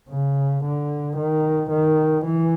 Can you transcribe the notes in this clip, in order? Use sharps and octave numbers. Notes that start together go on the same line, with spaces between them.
C#3
D3
D#3
D#3
E3